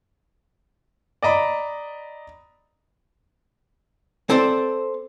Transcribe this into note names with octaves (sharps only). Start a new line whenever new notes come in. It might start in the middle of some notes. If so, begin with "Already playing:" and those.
D5 D#5 A#5 B5
C4 A4 C5 D5